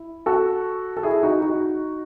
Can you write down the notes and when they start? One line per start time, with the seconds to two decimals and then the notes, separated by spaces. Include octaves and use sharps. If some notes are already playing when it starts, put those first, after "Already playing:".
Already playing: E4
0.26 F#4 A4
0.97 A4
1.03 E4 G#4
1.23 D#4 F#4
1.42 D#4 F#4